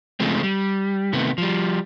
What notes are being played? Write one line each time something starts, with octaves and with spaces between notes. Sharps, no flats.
C#3 F3 G#3 A3 C4
G3
C3 D#3 A3 B3
F3 G3